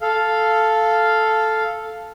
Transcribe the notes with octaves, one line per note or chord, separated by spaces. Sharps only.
A4 F5